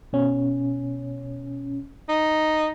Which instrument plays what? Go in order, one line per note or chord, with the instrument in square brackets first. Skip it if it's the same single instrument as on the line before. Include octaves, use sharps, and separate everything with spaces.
[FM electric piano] B2 C#4
[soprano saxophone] D#4